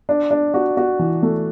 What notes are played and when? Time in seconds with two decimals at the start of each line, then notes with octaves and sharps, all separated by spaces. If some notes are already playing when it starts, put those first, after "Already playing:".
0.09 D4
0.31 D4
0.54 F#4
0.77 F#4
0.99 E3
1.23 A3